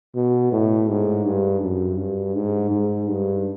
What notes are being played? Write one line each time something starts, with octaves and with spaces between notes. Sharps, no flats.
B2
A2
G#2
G2
F#2
G2
G#2
G#2
G2